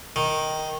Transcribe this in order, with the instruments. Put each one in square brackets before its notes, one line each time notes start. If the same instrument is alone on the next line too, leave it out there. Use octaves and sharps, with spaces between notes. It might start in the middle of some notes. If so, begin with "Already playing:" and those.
[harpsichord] D#3